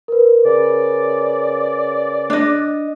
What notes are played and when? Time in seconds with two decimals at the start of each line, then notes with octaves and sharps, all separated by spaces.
0.08 A#4 B4
0.45 C#3 D5
2.30 D4 D#5